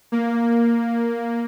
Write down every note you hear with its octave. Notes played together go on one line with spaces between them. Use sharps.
A#3